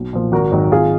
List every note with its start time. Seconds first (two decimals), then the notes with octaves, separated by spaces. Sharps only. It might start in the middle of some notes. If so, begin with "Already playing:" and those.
Already playing: B1
0.13 A#2 F3
0.32 G#1 F#4 A#4
0.51 G#2 D#3 F#3
0.71 G#1 F4 G#4